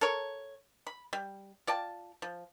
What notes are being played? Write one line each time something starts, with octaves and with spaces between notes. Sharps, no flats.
A4 A#4 C#5
B5
G3
F4 D5 G5 A5
F3